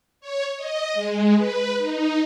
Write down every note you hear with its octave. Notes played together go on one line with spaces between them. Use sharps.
C#5
D#5
G#3
B4
D#4